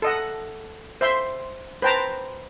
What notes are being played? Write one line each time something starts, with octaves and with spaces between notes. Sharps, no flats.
A4 D#5 F#5
C5 E5 C6
B4 C5 G5 A5 A#5